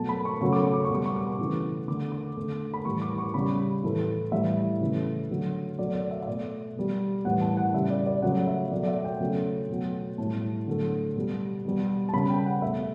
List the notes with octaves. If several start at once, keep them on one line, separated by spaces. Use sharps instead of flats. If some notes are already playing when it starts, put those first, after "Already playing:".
Already playing: B2 F#3 A3 A5
B5
C#6
C#3 F#3 A3 C#6
D6
C#6
D6
C#6
B2 G3 D6
C#6
D6
C#6
C#3 E3 A3
D3 A3 D6
D6
D3 A3
B5
A2 E3 G3 C#6
D6
C#6
C#3 G3 B5
A2 E3 A3
A2 E3 G3 E5
C#3 E3 A3
D3 F#3 A3
B2 F#3 A3 D5
D5
E5
E5
B2 A3 D5
B2 G3
A2 E3 G3 F#5
A5
F#5
C#3 G3 E5
D5
D5
C#3 F#3 A3 F#5
E5
B2 F#3 A3 D5
D5
E5
F#5
G5
C#3 F#3 A3
B2 F#3 A3
A2 G3 A5
D3 F#3 A3
B2 G3
B2 G3
A5
C#3 G3 B5
G5
F#5
B2 A3 E5